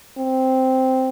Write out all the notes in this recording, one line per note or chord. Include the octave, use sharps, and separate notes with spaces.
C4